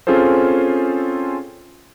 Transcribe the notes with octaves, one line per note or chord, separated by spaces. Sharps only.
C4 C#4 F4 G#4 A4 C5